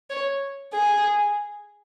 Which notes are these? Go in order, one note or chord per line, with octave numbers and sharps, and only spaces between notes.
C#5
G#4